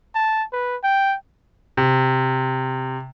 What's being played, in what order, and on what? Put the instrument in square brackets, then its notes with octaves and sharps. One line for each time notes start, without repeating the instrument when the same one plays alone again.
[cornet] A5
B4
G5
[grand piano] C3